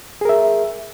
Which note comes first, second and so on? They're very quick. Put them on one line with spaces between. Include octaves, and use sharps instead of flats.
G#4 A#4 E5